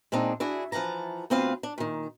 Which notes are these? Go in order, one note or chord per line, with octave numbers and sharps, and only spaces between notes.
A#2 G#3 C4 D4 D#4
D4 E4 F#4 G#4
E3 F3 F#5 A5 A#5
D2 B3 C4 F4 B4 F5
D4
A#2 D#3